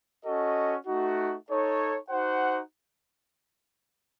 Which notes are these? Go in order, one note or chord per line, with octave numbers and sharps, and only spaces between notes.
C#4 F#4 A4 D#5
A3 D#4 F#4
D#4 A4 C#5
D#4 F#4 C5 F#5